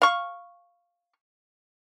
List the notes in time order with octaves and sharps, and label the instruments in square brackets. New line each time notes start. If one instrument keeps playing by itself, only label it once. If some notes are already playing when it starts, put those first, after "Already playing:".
[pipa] F5 C#6